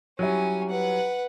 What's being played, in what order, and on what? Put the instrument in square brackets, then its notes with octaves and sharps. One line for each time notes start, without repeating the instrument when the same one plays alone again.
[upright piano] F#3 G3 E4 [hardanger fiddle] C#4 G#5
[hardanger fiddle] B4 F#5